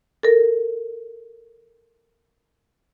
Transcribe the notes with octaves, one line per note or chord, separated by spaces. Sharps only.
A4 A#4